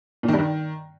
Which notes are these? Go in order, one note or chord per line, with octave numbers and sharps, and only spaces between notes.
A#2
D#3
G2
D#3